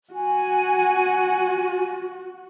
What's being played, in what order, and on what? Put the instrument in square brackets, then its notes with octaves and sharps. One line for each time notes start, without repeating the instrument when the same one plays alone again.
[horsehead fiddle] F#4 [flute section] G#5